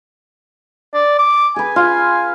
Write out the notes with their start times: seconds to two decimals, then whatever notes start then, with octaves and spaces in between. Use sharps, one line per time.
0.94 D5
1.19 D6
1.56 G#4 B4 G#5
1.76 F4